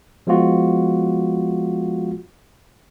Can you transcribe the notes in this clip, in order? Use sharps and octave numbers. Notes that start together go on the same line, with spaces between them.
F3 G#3 B3 F4 F#4